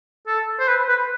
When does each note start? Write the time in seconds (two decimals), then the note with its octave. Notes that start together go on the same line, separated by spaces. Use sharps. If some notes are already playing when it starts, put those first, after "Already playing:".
0.27 A4
0.59 C5
0.68 B4
0.89 B4